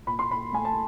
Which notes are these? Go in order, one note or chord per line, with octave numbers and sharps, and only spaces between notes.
A#2 B5
C6
A#2 B5
A3 G#5
A5